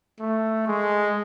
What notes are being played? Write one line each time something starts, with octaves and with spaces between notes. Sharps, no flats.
A3
G#3